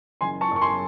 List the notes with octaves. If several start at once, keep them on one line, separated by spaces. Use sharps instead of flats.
F#1 G#5 C6
A5 C#6
F#2 C#6
G#5 C6